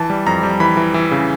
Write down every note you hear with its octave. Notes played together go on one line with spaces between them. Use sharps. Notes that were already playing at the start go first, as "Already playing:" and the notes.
Already playing: E3 A5
G3
F2 A#5
G3
E3 B5
E3
E3
C#3